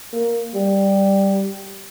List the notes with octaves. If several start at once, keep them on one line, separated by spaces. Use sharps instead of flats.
A#3
G3